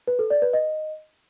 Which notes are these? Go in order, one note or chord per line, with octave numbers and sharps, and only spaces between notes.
B4
A4
D5
B4
D#5